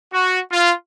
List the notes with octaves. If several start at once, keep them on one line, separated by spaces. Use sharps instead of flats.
F#4
F4